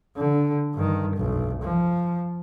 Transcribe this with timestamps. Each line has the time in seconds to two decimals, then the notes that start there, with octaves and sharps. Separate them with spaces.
0.17 D3
0.75 G2 D#3
1.16 F1 B1
1.62 F3